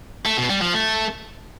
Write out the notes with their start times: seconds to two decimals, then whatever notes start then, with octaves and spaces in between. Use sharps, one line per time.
0.26 A3
0.38 B2
0.50 G3
0.62 F3
0.74 A3